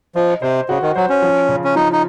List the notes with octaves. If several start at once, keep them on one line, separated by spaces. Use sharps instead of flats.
F3 D#5
C3 C5
C#3 F#4
D#3
F#3 C5
C#4
F3
C#3
C#4
F3 D#4
D#4